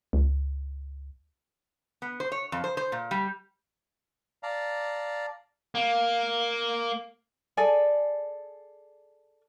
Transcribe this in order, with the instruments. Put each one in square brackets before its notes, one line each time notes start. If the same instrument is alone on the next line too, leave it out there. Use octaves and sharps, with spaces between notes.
[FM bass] C#2
[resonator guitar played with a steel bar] B3
C5
C#5
F2
C5
C5
A#2
G3
[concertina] D5 F5 A5 A#5
[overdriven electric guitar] A#3
[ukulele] G#4 A4 D5 G#5